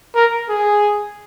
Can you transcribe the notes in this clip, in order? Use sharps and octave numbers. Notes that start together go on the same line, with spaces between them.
A#4
G#4